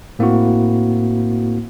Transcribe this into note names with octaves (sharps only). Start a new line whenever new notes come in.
A2 A#3 C4 E4 F#4